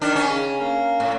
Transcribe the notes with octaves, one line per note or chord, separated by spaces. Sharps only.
D#3 D4
C#4
C#3
A#3
A2